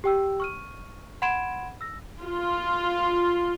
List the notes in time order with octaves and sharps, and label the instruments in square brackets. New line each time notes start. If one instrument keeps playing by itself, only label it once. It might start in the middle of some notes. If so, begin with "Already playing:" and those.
[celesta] G4 G5 E6
C#6 F6 D#7
F#5 B5 C6 G#6 D7 E7
E6 A#6
[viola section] F4